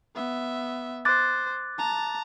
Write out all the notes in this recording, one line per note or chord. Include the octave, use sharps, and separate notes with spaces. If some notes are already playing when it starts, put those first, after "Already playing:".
B3 E5
C5 D6 F#6 A6
A5 A#5